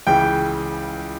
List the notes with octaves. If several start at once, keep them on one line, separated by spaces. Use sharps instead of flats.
C#2 C#3 E3 G5